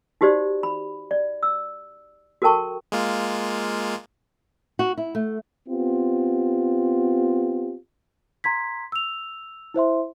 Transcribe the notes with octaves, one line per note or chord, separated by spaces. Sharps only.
D#4 F#4 G4 C5 D5
B5
D5
E6
F#4 A4 A#4 G5 A5 C#6
G#3 A#3 F4
F#4
E4
A3
B3 C4 F4 G4
A#5 C6 G#6 B6
E6 F7
E4 C5 E5 C6